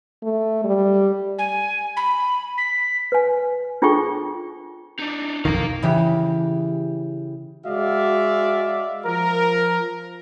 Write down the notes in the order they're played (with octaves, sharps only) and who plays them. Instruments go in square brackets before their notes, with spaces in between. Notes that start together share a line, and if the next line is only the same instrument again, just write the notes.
[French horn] A3
G3
[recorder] G#5
B5
B6
[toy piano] B4 G#5
D4 F4 G#4 A4 G5 C#6
[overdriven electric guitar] D4 D#4
[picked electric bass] B1 F2 D#3 [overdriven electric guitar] F5 A#5
[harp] C#3 E3 G4
[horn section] G#3 F#4 D5 E5 F5
F3 A#4